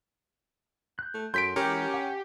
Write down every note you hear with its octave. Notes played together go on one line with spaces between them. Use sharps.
F#6 G6
A3
F#2 A4 C6 G6 B6 D7
E3 G#3 C#4 F#4 G4 A#4
F#5 G#5